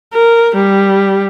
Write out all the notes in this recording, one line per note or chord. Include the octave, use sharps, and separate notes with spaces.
A#4
G3